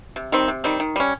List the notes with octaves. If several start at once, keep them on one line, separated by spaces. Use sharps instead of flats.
C3
D#3 G3 C4
C3
D#3 G3 C4
D#3
G3 C#4